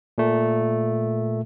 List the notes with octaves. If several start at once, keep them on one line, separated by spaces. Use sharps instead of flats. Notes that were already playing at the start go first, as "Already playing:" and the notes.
A#2 A3